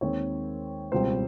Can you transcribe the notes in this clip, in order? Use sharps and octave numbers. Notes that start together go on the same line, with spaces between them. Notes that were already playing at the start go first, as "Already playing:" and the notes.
D#2 D#3 G#3 C4 C#5
C#2 B2 G3 C4 C5